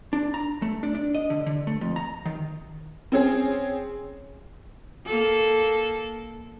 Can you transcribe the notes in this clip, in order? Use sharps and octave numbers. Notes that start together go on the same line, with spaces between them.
D4
A#5
A3
D4
D4
D#5
D3
D3
A3
F2
A#5
D#3
C4 C#4 G#4
A#3 A4